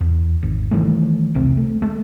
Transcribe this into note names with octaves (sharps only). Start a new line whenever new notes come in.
E2
G#1
D#3 E3 G3 A3
E1 C2 C3 C4
A3
G#3 A3